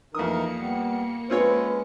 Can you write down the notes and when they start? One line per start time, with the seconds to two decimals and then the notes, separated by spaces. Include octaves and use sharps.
0.15 F2 E3 A#3 D#4 A#4 D#6 C#7
0.59 G3 B3
1.30 G#3 C4 C#4 F4 B4 C#5